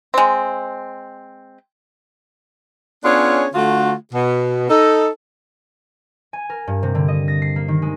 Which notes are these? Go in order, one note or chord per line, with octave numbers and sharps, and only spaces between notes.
G#3 C4
B3 C#4 D4 F4 G#4 C#5
D3 A3 F4 F#4
B2
D#4 A4
G#5
A#4
G2
C3
D3
D#5
A#6
C7
A#3
D#3
G#3